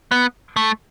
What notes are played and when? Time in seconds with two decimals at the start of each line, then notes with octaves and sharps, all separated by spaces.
0.12 B3
0.56 A3